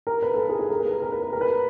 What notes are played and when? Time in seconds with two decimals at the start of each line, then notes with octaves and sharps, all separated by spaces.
0.07 A#4
0.22 B4
0.34 A4
0.38 A#4
0.49 G#4
0.59 G#4
0.70 A#4
0.81 B4
0.91 A#4
1.02 A#4
1.12 B4
1.22 B4
1.33 A#4
1.41 B4